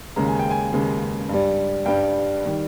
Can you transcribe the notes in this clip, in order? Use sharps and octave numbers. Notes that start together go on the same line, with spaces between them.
D#2 C#3 G#3 A#5
G#5
G5
G#5
D#2 C#3 G#3
G2 G3
G2 G3 G5
D#3 G3